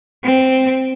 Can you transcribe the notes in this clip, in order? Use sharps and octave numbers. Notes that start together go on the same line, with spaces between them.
C4